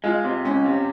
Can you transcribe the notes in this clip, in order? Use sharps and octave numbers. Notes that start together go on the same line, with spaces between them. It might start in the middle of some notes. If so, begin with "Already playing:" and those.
G#3 F4
C3
C#2 C#4
C3